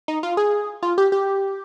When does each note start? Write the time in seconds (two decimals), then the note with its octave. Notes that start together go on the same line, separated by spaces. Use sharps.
0.08 D#4
0.23 F4
0.37 G#4
0.83 F4
0.98 G4
1.12 G4